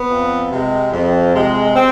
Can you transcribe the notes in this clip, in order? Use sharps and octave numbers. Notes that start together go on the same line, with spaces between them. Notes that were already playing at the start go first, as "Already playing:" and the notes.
Already playing: B3
F2
C3 G#3
F2
C3 G#3
C4